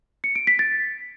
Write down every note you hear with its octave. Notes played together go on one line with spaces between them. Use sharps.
C#7
D7
B6
A6